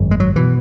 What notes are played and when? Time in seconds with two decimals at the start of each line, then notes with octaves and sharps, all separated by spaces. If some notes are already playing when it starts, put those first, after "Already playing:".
Already playing: G#1 F#2 C#3
0.11 G#3
0.20 F#3
0.36 B2 E3